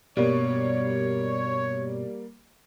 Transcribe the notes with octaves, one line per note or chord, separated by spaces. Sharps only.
G2 B2 G3 A#3 C#5